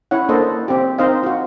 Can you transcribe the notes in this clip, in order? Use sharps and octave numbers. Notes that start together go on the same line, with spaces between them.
C#4 E4 C#5 F#5
A#3 D4 A4 C5 D#5
C4 G4
C4 D#4 C5 D#5 F5
F4 F#4